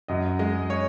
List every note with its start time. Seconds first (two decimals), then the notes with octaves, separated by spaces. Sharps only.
0.08 F#2 D#5
0.39 G#3 D#5
0.70 C#5